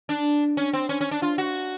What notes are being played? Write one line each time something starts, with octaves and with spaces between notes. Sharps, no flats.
D4
C#4
C4
C#4
C#4
D4
F4
F#4